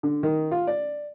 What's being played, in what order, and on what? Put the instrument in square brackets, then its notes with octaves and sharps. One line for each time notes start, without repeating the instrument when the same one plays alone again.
[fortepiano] D3
D#3
F4
D5